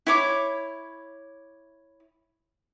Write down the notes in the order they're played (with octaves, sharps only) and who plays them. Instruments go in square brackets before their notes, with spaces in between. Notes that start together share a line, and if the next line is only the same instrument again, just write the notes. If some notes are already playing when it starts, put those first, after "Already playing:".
[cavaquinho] E4 C#5 D6